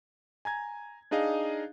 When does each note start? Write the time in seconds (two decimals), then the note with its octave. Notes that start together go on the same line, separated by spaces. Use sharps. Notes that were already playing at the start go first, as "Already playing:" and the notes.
0.45 G#5 A#5 G#6
1.11 D4 D#4 G#4 D#5 F5